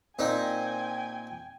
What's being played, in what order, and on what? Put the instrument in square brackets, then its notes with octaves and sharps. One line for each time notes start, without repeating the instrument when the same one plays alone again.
[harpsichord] A#2 C4 D#4 [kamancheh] G5 G#5